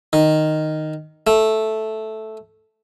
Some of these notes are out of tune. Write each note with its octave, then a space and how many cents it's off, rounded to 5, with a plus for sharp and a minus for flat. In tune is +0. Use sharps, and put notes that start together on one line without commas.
D#3 -5
A3 -5